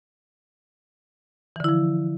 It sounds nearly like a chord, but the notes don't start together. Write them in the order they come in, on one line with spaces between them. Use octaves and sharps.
E3 D3 E4 F3